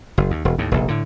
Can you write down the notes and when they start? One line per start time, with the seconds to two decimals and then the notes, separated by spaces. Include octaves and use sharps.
0.18 F#1
0.31 D#2
0.45 E1
0.58 D#2 A2
0.71 F1 A#1
0.88 A2 D3